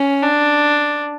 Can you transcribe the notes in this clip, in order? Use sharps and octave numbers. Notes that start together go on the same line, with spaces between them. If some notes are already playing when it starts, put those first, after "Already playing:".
Already playing: C#4
D4